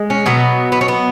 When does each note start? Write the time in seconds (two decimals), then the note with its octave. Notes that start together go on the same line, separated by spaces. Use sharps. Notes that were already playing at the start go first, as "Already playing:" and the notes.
Already playing: G#3
0.10 C#4
0.26 B2 F#3 B3
0.72 B3
0.81 C#4
0.88 B3